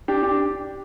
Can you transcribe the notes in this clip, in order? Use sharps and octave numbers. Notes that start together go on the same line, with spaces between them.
D4 G4
D4 G4